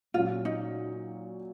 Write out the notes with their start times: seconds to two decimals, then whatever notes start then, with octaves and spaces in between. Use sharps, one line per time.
0.14 A#2 F#3 C#4 F4
0.45 D#4